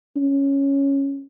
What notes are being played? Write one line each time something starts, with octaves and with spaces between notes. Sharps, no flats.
C#4